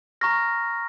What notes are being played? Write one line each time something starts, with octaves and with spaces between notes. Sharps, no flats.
A#5 C#6 F6 A#6